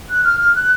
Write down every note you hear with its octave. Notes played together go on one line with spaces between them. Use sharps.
F#6
F6
F6
F#6